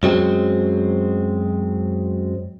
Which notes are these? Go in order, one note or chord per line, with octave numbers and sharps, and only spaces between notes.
F#2 F#3 G#3 C4